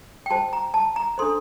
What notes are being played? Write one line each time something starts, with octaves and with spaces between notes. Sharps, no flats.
G5
F#4 C5 A5
A#5
A5
A#5
D4 A4 C5 C6